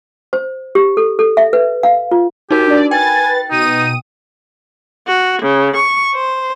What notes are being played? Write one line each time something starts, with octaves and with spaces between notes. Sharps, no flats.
C5
G4
A4
A4
E5
B4
F5
F4
D#4 F#4 G4 A#4
D4 D5
B4 G5 G#5 A6
B2 D#4 D#6 D#7
F#4
C#3
C#6
C5